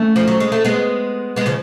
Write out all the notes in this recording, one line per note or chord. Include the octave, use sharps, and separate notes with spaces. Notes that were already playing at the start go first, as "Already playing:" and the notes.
Already playing: A3 C#4
F3
F#3
G#3
A3
G#3 B3
G#3 B3
C#3 F3